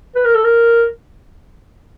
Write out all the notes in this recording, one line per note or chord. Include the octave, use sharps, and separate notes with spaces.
B4
A#4
A4
A#4